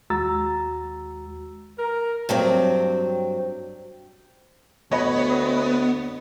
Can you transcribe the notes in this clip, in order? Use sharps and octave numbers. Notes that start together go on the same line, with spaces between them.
D#2 G#3 F#4 A#5 E6 A6
A#4
G2 F#3 C4
D2 B3 C#5 D#5 B5